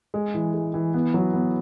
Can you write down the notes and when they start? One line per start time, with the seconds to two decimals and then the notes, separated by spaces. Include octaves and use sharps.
0.14 G#3
0.34 E3
0.54 G#3
0.74 E3
0.94 B3
1.14 F#3
1.34 B3